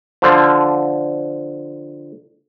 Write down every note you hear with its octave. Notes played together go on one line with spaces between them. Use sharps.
D3 F3